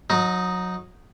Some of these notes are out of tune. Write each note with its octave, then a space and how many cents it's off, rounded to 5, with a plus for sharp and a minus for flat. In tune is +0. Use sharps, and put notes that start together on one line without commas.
F#3 -25 D#4 +0